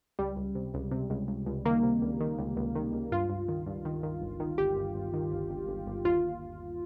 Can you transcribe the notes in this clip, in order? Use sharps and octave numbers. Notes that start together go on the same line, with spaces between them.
C#2 G3
C#2
C3
C#2
C3
C#2
C#2
C#2
D#3 A#3
C3
C#2
D#3
C#2
C#2
D#3
C#2
G2 F4
G2
D#3
G2
D#3
D#3
G1
D#3
G1 G4
G1
G1
D#3
G1
G1
G1
G1
D#2 F4